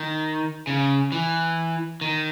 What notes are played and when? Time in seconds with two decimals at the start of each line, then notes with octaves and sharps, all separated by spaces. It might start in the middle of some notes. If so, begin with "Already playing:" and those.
Already playing: D#3
0.67 C#3
1.12 E3
2.01 D#3